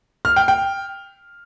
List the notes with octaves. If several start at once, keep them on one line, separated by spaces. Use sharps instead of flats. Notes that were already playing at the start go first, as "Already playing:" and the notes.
F6
G5
G5